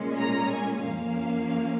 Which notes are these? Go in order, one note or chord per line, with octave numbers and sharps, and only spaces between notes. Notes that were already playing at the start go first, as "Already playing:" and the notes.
Already playing: A#2 G#3 C#4
A#5
G#5
F2 F3 A#3 C#4 F5